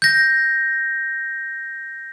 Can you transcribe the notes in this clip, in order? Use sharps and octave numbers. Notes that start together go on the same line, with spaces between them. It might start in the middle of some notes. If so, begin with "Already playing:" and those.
G6 A#6